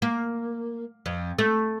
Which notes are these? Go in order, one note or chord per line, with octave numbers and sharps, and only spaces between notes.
A#3
F2
A3